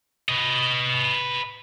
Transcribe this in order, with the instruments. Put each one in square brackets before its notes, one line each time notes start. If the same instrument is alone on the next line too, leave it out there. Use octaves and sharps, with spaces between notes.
[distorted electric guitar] B4 D#5